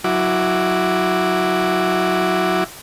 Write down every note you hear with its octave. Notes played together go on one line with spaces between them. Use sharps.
F#3 E4 F#4 D6